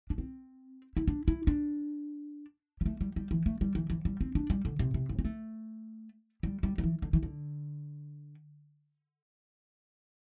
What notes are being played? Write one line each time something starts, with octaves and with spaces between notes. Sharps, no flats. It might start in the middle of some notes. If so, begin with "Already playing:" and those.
D4
C4
E4
D4
E4
D4
G3
A3
G3
G3
E3
A3
G3
E3
E3
G3
C4
D4
G3
D3
C3
C3
G2
C4
A3
G3
G3
G3
E3
D3
E3
D3